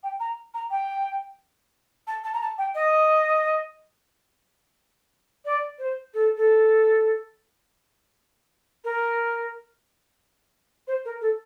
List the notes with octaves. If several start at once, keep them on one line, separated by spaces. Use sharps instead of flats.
G5
A#5
A#5
G5
A5
A5
A#5
A5
G5
D#5
D5
C5
A4
A4
A#4
C5
A#4
A4